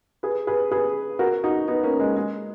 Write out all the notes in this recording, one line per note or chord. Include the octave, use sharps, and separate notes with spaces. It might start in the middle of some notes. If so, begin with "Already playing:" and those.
G#4 B4
G#4 B4
G#4 B4
F#4 A#4
D#4 F#4
B3 D#4
A#3 C#4
G#3
G#3